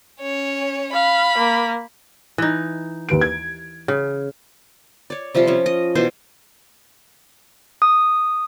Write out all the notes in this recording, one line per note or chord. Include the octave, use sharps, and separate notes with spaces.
C#4 C#5
F5 B5
A#3
E3 D#4
D#2 B4 D7
G#6
C#3
C#5 D5
C3 F3 G3 F4
F3 C#4
D#5
B2 E3 C5
D#6